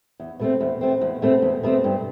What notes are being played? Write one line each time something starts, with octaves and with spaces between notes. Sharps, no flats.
E2
B2 A3 C4
E2
B2 A3 C4
E2
B2 A3 C4
E2
B2 A3 C4
G2